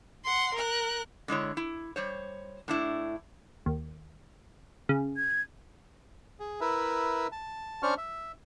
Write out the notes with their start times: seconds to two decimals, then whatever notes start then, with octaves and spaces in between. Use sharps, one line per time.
0.24 F#5 C6
0.55 A#4 F#6
1.28 D3 G#3 E4 C#5
1.57 E4
1.96 G3 C5 C#5
2.68 A2 D4 E4
3.66 D#2
4.89 C#3
5.17 G#6
6.40 G#4
6.61 E4 A#4 B4 E5
7.32 A5
7.83 C#4 D4 C5 D5 C#6 F6
7.98 E5